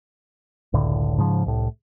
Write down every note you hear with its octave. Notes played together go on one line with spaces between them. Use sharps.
F#1 C#2 A2 D3
G#2 C#3 F3
C2 A2